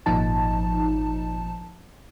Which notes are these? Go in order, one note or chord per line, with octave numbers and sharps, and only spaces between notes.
G#1 A#2 F3 D#4 A5